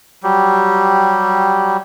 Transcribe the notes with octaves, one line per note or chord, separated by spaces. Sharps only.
F#3 G3 G4